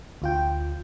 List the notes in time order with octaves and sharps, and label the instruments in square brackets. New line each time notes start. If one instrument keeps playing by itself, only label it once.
[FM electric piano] D2 F4 G5